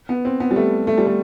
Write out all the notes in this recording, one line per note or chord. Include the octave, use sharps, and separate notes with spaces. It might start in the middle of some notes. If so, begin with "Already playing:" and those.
B3
C4
B3
G3
A3
A3
G3
A3